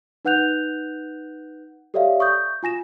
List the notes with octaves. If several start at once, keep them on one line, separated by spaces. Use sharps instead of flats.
D#4 B4 F#5 F#6 G6 F7
G4 A4 C#5 D5 E5 F5
C#6 D#6 G6
F4 G#5 A#6 E7